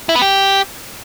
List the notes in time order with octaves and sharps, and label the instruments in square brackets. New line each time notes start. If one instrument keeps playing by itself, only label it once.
[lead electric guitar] E4
B3
G4